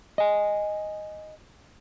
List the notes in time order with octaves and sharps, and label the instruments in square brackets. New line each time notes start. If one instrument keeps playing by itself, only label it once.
[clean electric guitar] D#5 G#5